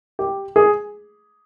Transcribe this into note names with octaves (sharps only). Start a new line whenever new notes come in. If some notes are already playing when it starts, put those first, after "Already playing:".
G4
G#4